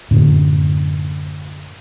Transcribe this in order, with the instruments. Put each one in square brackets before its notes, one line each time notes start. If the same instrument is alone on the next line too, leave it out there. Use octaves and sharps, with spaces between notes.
[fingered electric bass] F#2 A2 D3